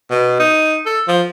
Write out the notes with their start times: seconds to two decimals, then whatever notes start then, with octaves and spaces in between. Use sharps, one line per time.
0.10 B2
0.40 D#4
0.86 A4
1.08 F3